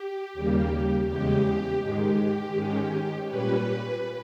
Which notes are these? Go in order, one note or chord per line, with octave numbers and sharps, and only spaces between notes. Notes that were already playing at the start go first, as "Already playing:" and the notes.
Already playing: G4
D#2 C#3 G3 A#3
E2 C#3 G#3 G4
G#2 D#3 G#3 G4
G#2 D#3 G#3 C#4
A#2 G3 C#4 B4